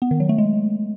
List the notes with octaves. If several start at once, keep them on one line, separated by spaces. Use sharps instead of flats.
B3
D#3
F#3
A3
G#3